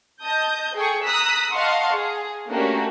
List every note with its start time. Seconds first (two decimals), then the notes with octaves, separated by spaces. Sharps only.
0.22 D#5 A5 D#6 G6
0.75 G#4 A4 G5 C#6
1.07 A#5 D#6 E6 F#6 B6
1.54 D#5 F5 F#5 A5 C6 C#6
1.95 G#4
2.50 A3 A#3 C#4 D4 F#4 G4